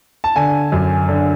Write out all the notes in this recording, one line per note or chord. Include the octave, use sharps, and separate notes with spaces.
A5
D3 G#5
F#2
D3